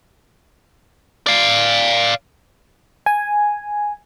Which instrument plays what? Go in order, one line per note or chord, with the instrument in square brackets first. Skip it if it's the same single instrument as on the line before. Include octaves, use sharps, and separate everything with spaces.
[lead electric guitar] D5 F5
[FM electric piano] G#5